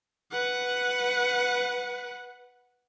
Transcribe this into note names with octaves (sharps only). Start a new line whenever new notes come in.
B4 F#5